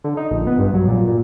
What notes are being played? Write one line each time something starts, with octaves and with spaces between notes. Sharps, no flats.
D3
D#4
A#1
B3
G2
F#3
A#2
A#2